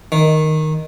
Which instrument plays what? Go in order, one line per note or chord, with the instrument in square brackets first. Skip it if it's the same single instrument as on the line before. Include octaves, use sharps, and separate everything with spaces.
[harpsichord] D#3